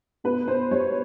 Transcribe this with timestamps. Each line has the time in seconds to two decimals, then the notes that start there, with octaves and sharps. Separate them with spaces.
0.24 B2 B4
0.47 B2 C5
0.71 G3 C#5